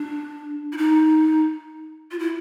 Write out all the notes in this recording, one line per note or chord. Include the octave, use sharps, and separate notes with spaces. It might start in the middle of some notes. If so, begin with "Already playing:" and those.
Already playing: D4
E4
D#4
F4
E4